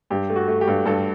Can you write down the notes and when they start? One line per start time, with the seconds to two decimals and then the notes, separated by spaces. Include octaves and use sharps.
0.10 G2 G4
0.29 A3
0.36 F#4
0.48 A3
0.61 G4
0.67 G2
0.85 G2 A3 A4